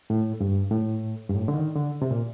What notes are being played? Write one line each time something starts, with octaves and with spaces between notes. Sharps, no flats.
A2
G2
A2
G2
A2
D3
D#3
D3
C3
A#2